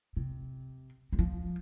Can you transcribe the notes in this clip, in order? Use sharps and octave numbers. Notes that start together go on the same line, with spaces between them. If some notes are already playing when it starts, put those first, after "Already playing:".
C3
G#3
F3